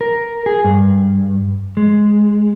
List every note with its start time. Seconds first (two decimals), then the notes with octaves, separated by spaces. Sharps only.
0.01 A#4
0.46 G#4
0.65 G2
1.77 G#3